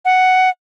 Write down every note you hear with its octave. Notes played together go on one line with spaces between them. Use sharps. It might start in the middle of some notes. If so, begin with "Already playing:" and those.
F#5